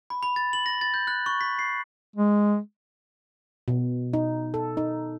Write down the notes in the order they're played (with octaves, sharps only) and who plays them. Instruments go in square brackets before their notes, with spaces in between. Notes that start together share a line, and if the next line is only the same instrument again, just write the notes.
[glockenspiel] B5
B5
A6
F#7
A#6
A6
G6
F#6
C#6
B6
C7
[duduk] G#3
[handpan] B2
D#4
A4
D#4